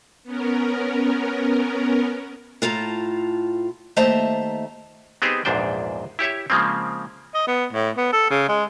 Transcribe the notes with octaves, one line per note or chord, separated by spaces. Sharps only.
B3 C#4 A#4
A2 F4 A4 A#5
D#2 A3 C5 E5 A5 A#5
B3 C4 D#4 G4 G#4 C5
A#1 E2 G#2 D4 C5 G5
E4 G4 C#5 E5
C#3 F3 G#3 A#3 C4
D#5
B3
A2
B3
A4
C#3
G#3